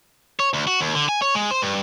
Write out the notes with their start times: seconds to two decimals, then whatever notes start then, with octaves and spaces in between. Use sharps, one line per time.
0.40 C#5
0.54 D2
0.67 F#4
0.81 D#2
0.95 D3
1.09 G#5
1.22 C#5
1.35 G#3
1.51 C5
1.62 G2